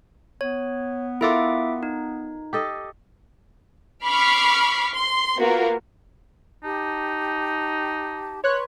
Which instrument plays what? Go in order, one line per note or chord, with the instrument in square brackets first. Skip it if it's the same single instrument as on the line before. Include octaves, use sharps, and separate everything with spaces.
[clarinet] B3 [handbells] C#5
[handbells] E4 E5 D6 [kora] F4 A4 A#4
[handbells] D#4
[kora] G4 A4 D#5
[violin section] B5 C#6 D6 F6 B6 C7
C6
A#3 B3 F4 F#4 A#4
[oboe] D#4 [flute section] G4 A5
[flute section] B4 C6 C#6 [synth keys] C#5 F#6